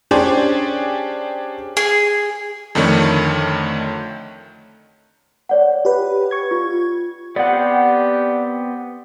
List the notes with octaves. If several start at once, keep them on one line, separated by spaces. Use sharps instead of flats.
C#4 D4 G4 G#4 C5 D5
G#4
F2 D3 D#3 A3 C#5
C#5 D5 F#5
G4 B4
C#6 G#6
F4
B3 C4 G4 C5 D5 F#5